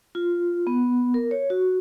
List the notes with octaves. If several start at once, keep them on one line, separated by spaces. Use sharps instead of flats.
F4
B3
A#4
C#5
F#4